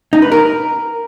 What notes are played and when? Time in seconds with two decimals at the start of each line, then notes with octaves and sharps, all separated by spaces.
0.13 D#4
0.22 B4
0.32 A#4